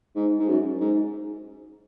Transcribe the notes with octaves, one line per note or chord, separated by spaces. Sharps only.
G#2
G#2
F#2
G#2